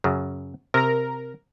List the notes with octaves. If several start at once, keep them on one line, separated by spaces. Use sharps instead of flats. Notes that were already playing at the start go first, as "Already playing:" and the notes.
F#2 C#3
C3 A#4 A#5